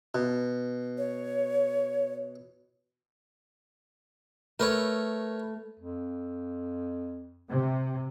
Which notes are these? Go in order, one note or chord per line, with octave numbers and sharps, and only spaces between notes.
B2
C#5
A3 A#4 B4 C#5
F2
C3